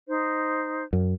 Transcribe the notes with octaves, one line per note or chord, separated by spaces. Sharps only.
D#4 C5
F#2